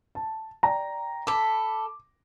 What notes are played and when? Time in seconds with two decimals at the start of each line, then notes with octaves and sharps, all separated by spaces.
0.15 A5
0.63 D5 G5 A#5
1.27 A4 B5 D6